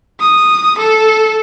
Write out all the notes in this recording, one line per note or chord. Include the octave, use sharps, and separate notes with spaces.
D#6
A4